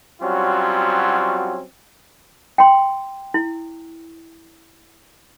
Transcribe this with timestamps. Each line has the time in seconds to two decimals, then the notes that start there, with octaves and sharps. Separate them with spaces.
0.21 F#3 G3 C4 C#4 F4 F#4
2.58 G5 C6
3.34 E4